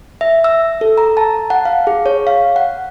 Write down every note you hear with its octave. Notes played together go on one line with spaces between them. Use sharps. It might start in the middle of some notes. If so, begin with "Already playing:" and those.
E5
E6
A4
A#5
A5
F#5
F5
G#4
C#5
F5
F#5